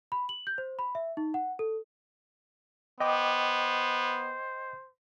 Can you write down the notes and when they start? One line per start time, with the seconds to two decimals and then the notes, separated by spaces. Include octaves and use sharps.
0.12 B5
0.29 F#7
0.47 G6
0.58 C5
0.79 B5
0.95 E5
1.17 D#4
1.34 F#5
1.59 A4
3.00 B3 C5 D#5 G5 D6